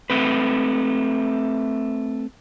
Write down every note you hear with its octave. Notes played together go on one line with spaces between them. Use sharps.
A3 C4 B4